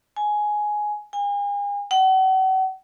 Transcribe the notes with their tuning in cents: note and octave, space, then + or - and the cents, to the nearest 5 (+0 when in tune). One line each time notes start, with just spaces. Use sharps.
G#5 +10
G#5 -40
F#5 +40